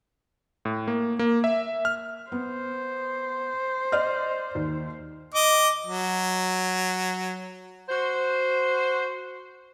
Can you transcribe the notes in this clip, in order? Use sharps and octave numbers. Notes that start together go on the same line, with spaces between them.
A2
A#3
A#3
E5
F6
B3 C5
D5 D#5 F6
D#2
D#5 D6
F#3
F#4 C5